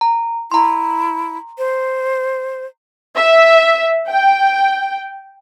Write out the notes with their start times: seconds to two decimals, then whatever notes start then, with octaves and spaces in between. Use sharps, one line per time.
0.01 A#5
0.52 E4 A#5 C6
1.58 C5
3.14 E5
4.08 G5